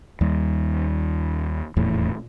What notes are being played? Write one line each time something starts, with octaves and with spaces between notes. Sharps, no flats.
D#2 G3
D#1 E2 A2